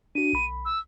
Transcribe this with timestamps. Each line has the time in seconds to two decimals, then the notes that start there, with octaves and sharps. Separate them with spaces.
0.15 D4 F#4 D#7
0.33 B1 B5
0.65 E6